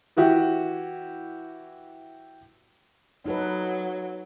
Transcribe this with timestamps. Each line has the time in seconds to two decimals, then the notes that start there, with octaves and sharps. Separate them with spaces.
0.17 E3 E4 F#4 G4
3.26 F#3 D#4 A4 B4